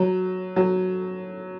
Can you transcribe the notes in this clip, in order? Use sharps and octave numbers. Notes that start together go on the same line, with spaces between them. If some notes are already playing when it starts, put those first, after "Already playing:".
Already playing: F#3
F#3